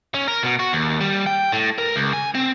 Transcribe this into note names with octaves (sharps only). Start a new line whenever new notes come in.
C#4
A#4
B2
F#4
D#2
G3
G5
A2
A#4
C#2
G#5
C4